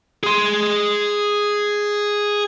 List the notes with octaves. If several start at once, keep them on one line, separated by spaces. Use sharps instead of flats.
G#4 C6